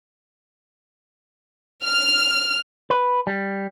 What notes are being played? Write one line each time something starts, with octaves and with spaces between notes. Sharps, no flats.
F6
B4
G3